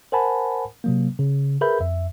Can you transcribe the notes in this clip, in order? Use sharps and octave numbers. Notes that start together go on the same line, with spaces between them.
A#4 C5 F#5 G#5 A5 B5
C3 F#3 A#3
C#3
G#4 A#4 B4 E5 B5 G6
F2 E5